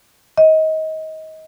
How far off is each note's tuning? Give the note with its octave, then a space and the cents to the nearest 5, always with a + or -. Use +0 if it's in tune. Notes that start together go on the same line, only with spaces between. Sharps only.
D#5 +25